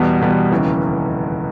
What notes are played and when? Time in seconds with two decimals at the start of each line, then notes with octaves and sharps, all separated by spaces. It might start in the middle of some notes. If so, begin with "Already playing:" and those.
Already playing: E2 B2 G3 B3
0.21 E2 B2 G3 B3
0.51 F1 D#2 C#3 E3